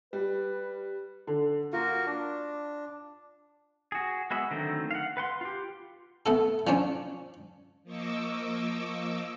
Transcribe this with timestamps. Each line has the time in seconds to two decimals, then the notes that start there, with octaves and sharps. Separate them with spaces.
0.13 G3 B4
1.27 D3
1.73 A#3 F4 F#4 A#4
2.06 D4
3.92 F#4 G#4
4.31 G#3 B3 F#4 E5
4.51 D3 D#3 F#3 A3 C4
4.91 F5 F#5
5.17 B4 F#5 C6
5.41 F4 G4
6.26 A3 B3 A4
6.67 F3 C#4 D4 C#5
7.84 F3 A#3 D#5 C#6 D6 E6